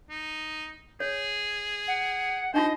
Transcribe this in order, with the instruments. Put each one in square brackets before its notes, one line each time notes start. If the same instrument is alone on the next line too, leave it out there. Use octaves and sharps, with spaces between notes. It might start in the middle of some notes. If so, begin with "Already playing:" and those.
[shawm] D#4
[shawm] G#4 [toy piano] C#5
[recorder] F#5
[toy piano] D4 D#4 F4 [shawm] C5 [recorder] D#5